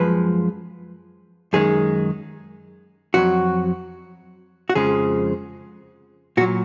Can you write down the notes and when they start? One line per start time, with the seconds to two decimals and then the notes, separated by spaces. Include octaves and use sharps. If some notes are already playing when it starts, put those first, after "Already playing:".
Already playing: F#2 F3 G#3 B4
1.53 F#2 D#3 G#3 G#4
3.14 F2 D#3 F#3 F#4
4.70 F#4
4.75 F2 C#3 F3 G#3 G#4
6.37 A#2 F#4
6.41 F#3